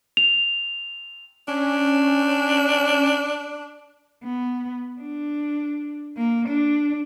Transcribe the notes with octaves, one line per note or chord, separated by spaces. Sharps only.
F7
C#4 D4
B3
D4
A#3
D4